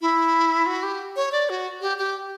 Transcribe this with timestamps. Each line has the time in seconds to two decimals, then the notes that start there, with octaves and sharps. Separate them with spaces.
0.01 E4
0.66 F#4
0.83 G4
1.16 C#5
1.32 D5
1.49 F#4
1.81 G4
1.98 G4